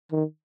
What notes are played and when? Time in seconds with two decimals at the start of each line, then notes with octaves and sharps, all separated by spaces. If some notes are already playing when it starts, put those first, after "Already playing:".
0.12 D#3